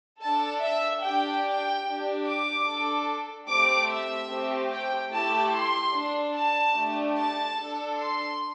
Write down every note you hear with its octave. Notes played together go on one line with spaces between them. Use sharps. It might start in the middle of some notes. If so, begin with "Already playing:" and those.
D4 A4 A5
E5
D4 G4 G5
G5
D4 G4
D6
D4 A4
A3 C4 G4 D6
E5
A3 C4 G4
G5
A3 E4 G4 A5
C6
D4 A4
A5
A3 D4 G4
A5
D4 A4
C6